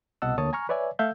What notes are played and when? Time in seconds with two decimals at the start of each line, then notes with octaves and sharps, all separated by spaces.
0.22 C2 B2 D#5 F#5 A5 E6
0.38 D2 A3 A#3 C#5 A5 D#6
0.53 G#5 A#5 C#6 F6
0.69 B4 C#5 D5 E5 G#5
0.99 A3 A4 E5 F5 E6 G6